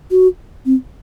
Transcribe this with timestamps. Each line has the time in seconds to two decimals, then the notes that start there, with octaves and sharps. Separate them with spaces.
0.11 F#4
0.66 C4